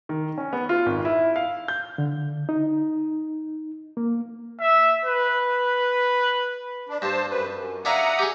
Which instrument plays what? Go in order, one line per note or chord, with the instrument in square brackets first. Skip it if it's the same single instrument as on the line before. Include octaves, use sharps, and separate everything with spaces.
[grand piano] D#3
C#4
B3
F4
G#1
E4
F5
G6
[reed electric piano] D3
D#4
A#3
[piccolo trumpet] E5
B4
[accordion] D4
[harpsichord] G2 [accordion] C5 A5
[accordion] F#2 B4
F#2
[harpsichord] D4 E4 F5 [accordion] F#5 A#5 D#6
[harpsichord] G4 G#4